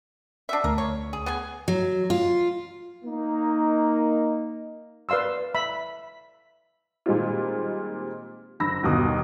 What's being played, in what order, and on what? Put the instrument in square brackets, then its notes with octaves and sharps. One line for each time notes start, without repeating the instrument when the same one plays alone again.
[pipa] D4 F#4 E5
[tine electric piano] D2 [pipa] A#4
[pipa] C#5
G#4
B3 G#4 G#5
[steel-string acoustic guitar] F#3
F4
[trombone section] A#3 D#4
[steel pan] B4 D5 F5 C6 E6
E5 B5
[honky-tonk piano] A#2 D#3 G3 G#3 C4 F4
F#1 D3 B5 E6 A#6
G1 D#2 B2 D#6